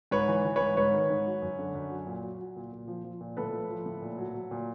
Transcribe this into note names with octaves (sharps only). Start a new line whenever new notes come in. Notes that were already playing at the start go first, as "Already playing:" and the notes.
G#2 B4 C#5
E3
E3
G#2 B4 C#5
G#2 B4 C#5
D#3
G#2
F#3
F#2
D3
F#2
F#3
A#2
F#3
F#3
A#2
A#2
F3
F3
A#2
A2 A4 B4
F3
F3
A2
A#2
F#3
F#3
A#2